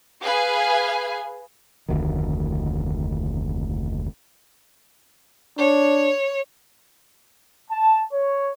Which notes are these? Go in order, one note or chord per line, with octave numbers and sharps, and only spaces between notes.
G#4 B4 F5 G#5
F1 D2 D#3
D4 C#5
A5
C#5